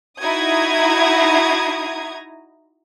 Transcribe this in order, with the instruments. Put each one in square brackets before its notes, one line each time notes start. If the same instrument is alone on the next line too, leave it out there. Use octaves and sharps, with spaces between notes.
[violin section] D#4 E4 F#4 A#5 D#6 G#6